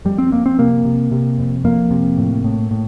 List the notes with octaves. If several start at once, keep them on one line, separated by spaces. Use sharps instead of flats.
F2 G3
C4
F2 A#3
C4
C3 A#3
C3
C3
F2
F2 A#3
C3
A2
A2
A2